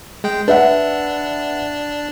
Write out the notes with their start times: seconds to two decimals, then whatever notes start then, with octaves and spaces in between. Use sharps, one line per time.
0.24 G#3 G5
0.48 D4 B4 E5 F#5